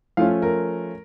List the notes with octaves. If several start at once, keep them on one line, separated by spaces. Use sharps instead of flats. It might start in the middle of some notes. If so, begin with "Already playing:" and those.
F3 A3 C#4 F4 F5
A#4